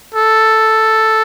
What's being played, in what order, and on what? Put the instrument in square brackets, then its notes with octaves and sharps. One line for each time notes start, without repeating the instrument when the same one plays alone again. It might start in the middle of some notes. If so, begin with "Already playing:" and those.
[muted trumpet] A4